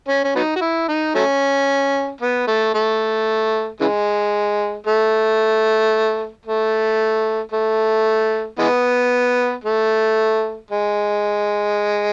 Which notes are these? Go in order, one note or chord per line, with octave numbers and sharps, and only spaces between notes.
C#4
C#4
F#3 B3 D#4
F#4
E4
D#4
F#3 A3 C#4
B3
A3
A3
C#3 E3 G#3
A3
A3
A3
E3 G#3 B3
A3
G#3